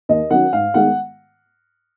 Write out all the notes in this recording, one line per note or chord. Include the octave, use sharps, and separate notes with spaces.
D#2 D#5
D#3 F#3 C#4 F#5
G#2 F5
D#3 G#3 B3 F#5